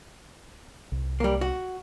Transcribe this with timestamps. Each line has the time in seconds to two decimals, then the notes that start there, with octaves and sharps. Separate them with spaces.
0.92 C2
1.20 G3 A#3
1.41 F#4